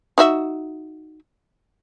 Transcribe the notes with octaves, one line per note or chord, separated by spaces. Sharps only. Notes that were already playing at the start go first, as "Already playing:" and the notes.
D#4 F#4 E5